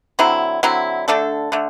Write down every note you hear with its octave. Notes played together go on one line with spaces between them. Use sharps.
D3 F#3 C4 E4
D3 F#3 C4 E4
D3 A3 D4 A4
D3 A3